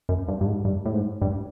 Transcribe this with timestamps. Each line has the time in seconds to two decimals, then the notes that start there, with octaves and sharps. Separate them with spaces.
0.09 F#2
0.28 G2
0.41 G2
0.46 G#2
0.65 G2
0.85 A2
0.93 G#2
1.22 G2